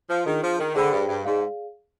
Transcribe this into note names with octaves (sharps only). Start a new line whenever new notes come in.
F3
D#3 D4 F4 G#4
F3
D#3
D3 G#4 C5 G5 B5
G2
G2
G#2 G#4 D5 F5